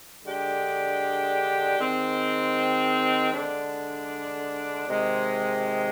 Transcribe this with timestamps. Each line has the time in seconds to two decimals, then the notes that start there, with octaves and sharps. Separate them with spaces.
0.25 D3 G#3 D4 G4
1.79 D#3 G#3 C4
3.33 D3 G#3 D4
4.88 C3 D#3 G#3